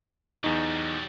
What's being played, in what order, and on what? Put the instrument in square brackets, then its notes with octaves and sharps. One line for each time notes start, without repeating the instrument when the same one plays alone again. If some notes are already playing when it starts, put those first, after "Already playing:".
[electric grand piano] E2 D#4 [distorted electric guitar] F#3 G3